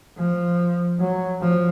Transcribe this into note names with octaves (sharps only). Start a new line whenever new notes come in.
F3
F#3
F3